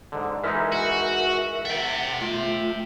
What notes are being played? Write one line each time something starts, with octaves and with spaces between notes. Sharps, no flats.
G#2 D3
E3 G#3 D#4 A#4 E5
F#4
E5 F#5 G5 A6
A3 F4